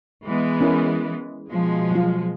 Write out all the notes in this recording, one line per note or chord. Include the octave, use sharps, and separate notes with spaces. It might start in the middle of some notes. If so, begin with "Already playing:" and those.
E3 G#3 B3
C#4 E4 A#4
B2 F3 G#3
F#3 F4